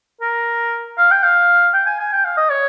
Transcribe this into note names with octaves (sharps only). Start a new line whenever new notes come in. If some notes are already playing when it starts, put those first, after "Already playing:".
A#4
F5
G5
F5
G5
G#5
G#5
G5
F5
D#5
C#5